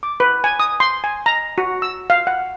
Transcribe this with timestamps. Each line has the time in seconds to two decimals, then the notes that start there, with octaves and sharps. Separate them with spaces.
0.03 D6
0.20 B4
0.44 G#5
0.60 D#6
0.80 C6
1.04 G#5
1.26 A#5
1.58 F#4
1.82 E6
2.10 F5
2.27 F#5